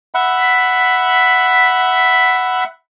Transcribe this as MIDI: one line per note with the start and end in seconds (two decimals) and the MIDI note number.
0.14 2.64 76
0.14 2.64 78
0.14 2.64 83